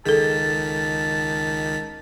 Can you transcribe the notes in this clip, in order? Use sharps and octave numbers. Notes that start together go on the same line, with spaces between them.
C#2 D#3 G#4 A4 A5 B6